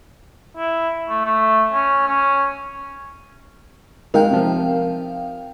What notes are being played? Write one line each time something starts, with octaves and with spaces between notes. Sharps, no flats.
E4
A3
A3
C#4
C#4
G#3 D#4 A#4 F5 G5
C3 F3